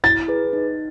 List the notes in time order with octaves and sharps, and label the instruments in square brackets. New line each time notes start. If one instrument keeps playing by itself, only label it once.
[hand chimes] E4 [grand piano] A6
[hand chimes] G#4 B4
D#4